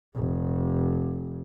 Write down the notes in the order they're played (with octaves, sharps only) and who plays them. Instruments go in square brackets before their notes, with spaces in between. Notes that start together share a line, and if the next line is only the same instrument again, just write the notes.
[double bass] F1